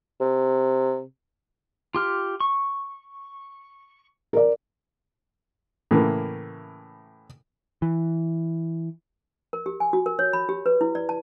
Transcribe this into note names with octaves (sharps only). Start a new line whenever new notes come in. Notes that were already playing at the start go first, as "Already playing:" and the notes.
C3
F4 G4 F6
C#6
A#4 D5
A2 C#3 E3 A#3
E3
A#4
G4
G#5
F#4
A#4
C#5
B5
G4
B4
E4
D5
A5